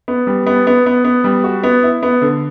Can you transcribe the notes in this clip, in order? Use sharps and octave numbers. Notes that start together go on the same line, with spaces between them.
B3
G3
B3
B3
B3
B3
G3
F#4
B3
E4
B3
D3